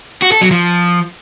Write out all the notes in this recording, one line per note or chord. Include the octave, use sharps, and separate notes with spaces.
F#4
A4
F#3
F3